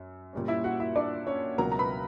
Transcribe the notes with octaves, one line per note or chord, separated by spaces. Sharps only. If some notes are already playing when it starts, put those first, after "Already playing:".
Already playing: F#2
A#2 G3 C#4
E4 E5
F#4 F#5
E4 E5
D4 D5
C#4 C#5
C#2 B2 F#3 A#4 A#5
A#5
B4 B5